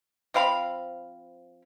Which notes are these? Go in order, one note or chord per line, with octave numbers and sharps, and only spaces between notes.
F3 C4 F5 B5